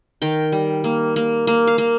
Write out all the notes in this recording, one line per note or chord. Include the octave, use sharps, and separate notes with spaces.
D#3 G5
G3
A#3
A#3
A#3
F5
A#3